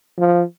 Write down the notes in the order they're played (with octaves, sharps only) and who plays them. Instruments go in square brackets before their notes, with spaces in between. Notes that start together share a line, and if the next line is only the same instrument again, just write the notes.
[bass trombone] F3